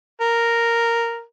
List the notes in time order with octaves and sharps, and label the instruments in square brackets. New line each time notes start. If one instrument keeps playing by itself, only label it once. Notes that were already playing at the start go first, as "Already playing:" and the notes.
[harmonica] A#4